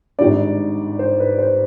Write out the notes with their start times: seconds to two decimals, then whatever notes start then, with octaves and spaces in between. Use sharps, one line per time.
0.19 G#1 G#2 G3 D4 D5
0.99 C5
1.20 B4
1.39 C5